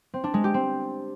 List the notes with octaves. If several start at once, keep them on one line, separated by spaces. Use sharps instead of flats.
C4
D4
G#3
G4
C4